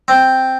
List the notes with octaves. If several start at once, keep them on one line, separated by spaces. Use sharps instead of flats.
C4